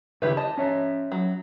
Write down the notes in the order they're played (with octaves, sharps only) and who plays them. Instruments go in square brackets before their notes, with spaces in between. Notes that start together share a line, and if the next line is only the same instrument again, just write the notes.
[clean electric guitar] D#2 C#3 E5 [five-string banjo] E4 G4 B4
[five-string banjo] D#5 [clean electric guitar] A5
[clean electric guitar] C#4 C#5 E5
[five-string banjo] F#3